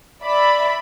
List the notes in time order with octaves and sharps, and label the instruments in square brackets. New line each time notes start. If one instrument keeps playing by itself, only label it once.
[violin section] D5 E5 B5